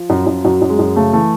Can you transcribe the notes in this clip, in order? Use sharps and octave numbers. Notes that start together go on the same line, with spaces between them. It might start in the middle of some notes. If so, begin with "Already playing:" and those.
Already playing: F3
F#2
F#2
F#2 F#3
F#2
G#3
F#2
C#3 A3
E3 A3